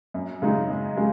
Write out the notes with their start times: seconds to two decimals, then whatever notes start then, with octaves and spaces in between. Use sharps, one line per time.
0.14 F#2
0.42 C#3 G#3 D#4
0.70 F#2
0.97 C#3 G#3